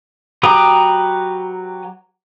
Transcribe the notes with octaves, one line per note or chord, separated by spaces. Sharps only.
F#3 G4 B4 A#5 D#6